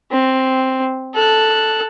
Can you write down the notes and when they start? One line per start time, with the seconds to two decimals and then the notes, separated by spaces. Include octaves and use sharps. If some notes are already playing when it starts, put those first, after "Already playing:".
0.11 C4
1.15 A4 F#6